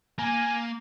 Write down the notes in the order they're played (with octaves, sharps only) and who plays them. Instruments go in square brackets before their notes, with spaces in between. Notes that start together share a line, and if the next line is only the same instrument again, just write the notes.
[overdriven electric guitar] A#3 [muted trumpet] G#5